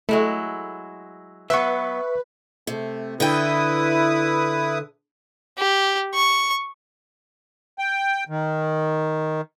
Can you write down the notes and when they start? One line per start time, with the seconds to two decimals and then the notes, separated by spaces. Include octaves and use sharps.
0.09 F#3 G#3 A3 E4
1.50 F#3 B3 B4 E5 C#6
2.67 C3 A3
3.20 D3 E4 B4 G5 D#6
5.58 G4
6.15 C#6
7.79 G5
8.29 D#3